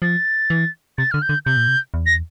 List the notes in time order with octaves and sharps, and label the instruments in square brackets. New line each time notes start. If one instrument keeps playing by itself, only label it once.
[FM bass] F3 [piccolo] A6
[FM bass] E3
[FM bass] C3 [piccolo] A6
[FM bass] D3 [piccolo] F6
[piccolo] G6
[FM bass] D3
[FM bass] C3 [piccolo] G6
[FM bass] A#2
C3
E2
[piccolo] A#6